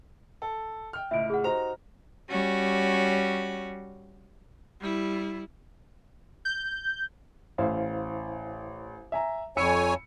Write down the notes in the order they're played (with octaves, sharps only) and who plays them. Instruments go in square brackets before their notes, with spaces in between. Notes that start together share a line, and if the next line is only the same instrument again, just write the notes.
[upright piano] A4
G5 F6
[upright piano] C#2 A2 [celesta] E5 D7
[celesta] G#4 F#5
[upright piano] D#4 F#4 A#5 [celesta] G4 C5 F7
[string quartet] G3 C#4 F#4
[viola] G3 E4
[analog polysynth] G6
[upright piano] A1 [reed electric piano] E4 C5 F5
[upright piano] E5 G#5 A#5
[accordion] F2 C#5 G#5 [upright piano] B5 E6 C#7